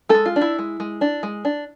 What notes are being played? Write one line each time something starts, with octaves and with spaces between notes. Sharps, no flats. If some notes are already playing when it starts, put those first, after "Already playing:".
G#3 A3 A4
F4
D4
E4
G#3
G#3
D4
G#3
D4